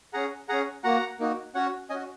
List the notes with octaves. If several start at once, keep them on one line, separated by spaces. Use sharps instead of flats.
C#4 G#4 F#5 A#5
C#4 G#4 F#5 A#5
A#3 F#4 F#5 A#5
A#3 D#4 F#4
C#4 F#4 C#5 F#5
C#4 F#4 D#5 G#5